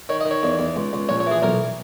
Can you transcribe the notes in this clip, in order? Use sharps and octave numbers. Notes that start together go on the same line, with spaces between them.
D#3 C#5
D#5
D#3
C#5
E2
E2
C#2
C#2
A#1 C#5
C#5
E3 G#4
B1 A#4